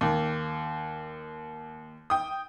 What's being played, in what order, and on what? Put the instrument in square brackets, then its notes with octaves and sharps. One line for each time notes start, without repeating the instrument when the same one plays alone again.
[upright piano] D#2
G5 D#6